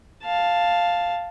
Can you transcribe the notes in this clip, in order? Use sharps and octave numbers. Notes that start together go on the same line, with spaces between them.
F5 A5